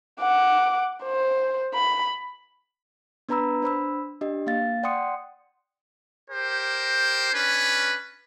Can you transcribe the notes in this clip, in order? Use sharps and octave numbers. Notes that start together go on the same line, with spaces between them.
F#5 D6
C5
B5
B3 D4 B4 A#5 B5 E6
D4 C5 B5 E6
D4 G4 D#5
A#3 F5 A6
D5 F#5 G5 C6 D#6 C#7
G4 A#4 C5
C#4 D4 B4